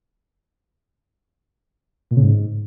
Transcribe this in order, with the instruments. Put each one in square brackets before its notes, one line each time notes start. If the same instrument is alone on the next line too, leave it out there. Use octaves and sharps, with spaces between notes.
[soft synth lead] A#2
C#3
G#2